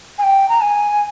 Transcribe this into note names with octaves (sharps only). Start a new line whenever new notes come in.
G#5
G5
A#5
G#5